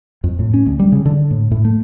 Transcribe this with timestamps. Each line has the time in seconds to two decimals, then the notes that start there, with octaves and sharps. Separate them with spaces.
0.24 F2
0.39 A2
0.54 C#4
0.66 D2
0.80 G3
0.92 C#3
1.06 D3
1.31 A2
1.51 A2
1.65 A3